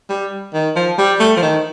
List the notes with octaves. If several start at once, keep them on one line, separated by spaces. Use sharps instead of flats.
G3
D#3
F3
G3
A3
F3
D#3